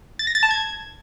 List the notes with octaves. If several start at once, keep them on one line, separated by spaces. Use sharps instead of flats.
A6
A#6
A6
A5
G#6